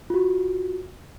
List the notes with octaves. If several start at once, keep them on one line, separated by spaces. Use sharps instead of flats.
F4 F#4